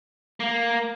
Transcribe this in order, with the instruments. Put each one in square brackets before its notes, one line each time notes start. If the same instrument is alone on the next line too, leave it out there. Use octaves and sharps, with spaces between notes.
[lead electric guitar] A#3